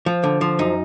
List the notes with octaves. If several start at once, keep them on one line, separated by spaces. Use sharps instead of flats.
F3
D3
F3
F#2 D#4